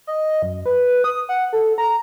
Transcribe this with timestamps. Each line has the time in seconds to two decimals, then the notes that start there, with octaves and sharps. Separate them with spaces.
0.07 D#5
0.42 F#2
0.66 B4
1.04 D#6
1.29 F#5
1.53 A4
1.78 A#5